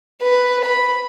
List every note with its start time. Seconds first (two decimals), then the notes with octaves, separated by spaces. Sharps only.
0.22 B4
0.65 B5